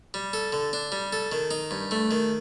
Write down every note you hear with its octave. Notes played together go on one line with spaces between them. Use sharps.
G3
A4
D3
D4
G3
A4
D#3
D#4
G2
A3
D#3